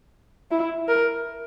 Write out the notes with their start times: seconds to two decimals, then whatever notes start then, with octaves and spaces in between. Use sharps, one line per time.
0.51 E4
0.89 A#4